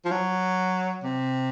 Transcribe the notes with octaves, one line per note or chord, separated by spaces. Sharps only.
F3
F#3
C3